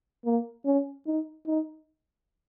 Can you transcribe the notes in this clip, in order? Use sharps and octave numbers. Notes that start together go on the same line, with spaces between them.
A#3
C#4
D#4
D#4